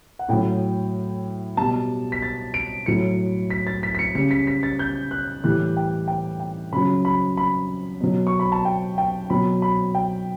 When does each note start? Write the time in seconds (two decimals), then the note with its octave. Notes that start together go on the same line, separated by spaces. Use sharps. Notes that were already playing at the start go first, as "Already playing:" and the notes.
0.19 F#5
0.29 A2 F#3 G5
1.57 B2 G3 A5
2.12 B6
2.22 A6
2.54 D7
2.86 A2 F#3 C#7
3.50 B6
3.67 A6
3.83 B6
3.95 B6
3.99 C#7
4.15 C#3 G3 C#7
4.31 B6
4.47 B6
4.63 A6
4.79 G6
5.11 F#6
5.43 A2 E3 G3 F#6
5.77 G5
6.08 G5
6.40 G5
6.72 C#3 F#3 B5
7.05 B5
7.37 B5
8.01 B2 F#3
8.27 C#6
8.40 B5
8.52 A5
8.65 G5
8.98 G5
9.30 B2 F#3 B5
9.62 B5
9.95 G5